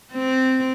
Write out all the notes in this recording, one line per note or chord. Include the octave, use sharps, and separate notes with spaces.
C4